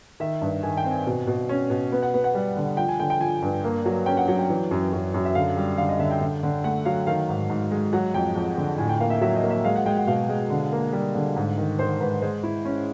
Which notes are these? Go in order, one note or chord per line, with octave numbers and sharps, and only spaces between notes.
D#3 E5
G2
D#3 G#5
G5
C4
G#5
B2
B2
C#4
B2
B3
F#5
B3
F#5
G3
D3
F3 G5
G#5
D3 G5
G5
F3 G#5
G2
A#3
F#3
C#4 G5
F#5
F#3 F#5
G5
E3
F#2
F#2
F#2
E5
D3 F5
G3
D3 F5
D#5
D3 E5
G5
D3
D3
A3 F#5
F#3 F5
D#3 F5
G#2
G#2
G#3
F#3 F#5
F2 G5
F2
D3
A2 G#5
G5
A#3 F5
E5
F#3 E5
D#5
A#3
E5
G#3 F5
F#5
G#3 G5
F#5
B2 F5
G#3
D3
A#3
G3
D3
G#2
D#3
D#3 C5
G#2 B4
G#3 C5
E4
C#4